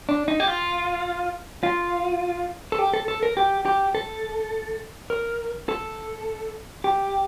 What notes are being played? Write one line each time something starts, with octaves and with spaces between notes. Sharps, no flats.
D4
D#4
G4
F4
F4
A4
G4
A4
A4
A#4
G4
G4
A4
A#4
A4
G4